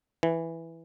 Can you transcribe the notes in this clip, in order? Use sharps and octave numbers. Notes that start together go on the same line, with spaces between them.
E3